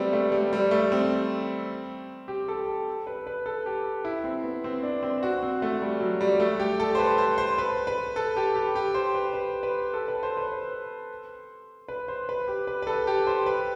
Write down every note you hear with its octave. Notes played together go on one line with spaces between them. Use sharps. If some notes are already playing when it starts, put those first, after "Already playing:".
Already playing: G3 A3 B3 C4
A3
G3
G3
A3
C4
G4
A4
B4
B4
A4
G4
E4
C4
B3
C4
D4
C4
F#4
C4
A3
G3
F#3
G3
A3
G4
A4
C5
B4
C5
C5
B4
B4
A4
G4
G4
G4
C5
B4
B4
B4
A4
B4
C5
B4
C5
B4
C5
B4
G4
B4
B4
A4
G4
C5
B4